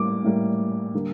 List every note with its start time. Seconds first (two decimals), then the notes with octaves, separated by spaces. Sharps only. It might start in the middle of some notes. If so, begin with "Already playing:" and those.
Already playing: A2 G3 A#3 D6
0.24 A2 G3 A#3
0.94 D3 G3 A#3